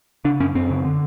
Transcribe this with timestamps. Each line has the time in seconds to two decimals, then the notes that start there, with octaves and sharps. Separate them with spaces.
0.25 C#3 D4
0.40 F#2 C#4
0.55 F#2 C4
0.70 C#3
0.85 D3